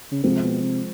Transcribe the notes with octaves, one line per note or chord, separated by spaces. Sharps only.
C#3
C3 F3 G#3 C4
B2
C3